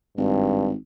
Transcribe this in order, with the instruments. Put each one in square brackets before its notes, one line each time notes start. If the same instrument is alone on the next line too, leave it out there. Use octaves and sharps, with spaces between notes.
[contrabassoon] G#1 [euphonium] G2